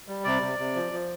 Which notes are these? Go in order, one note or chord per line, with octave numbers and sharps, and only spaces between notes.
G3
C3 D5
C3
C3
F3
F3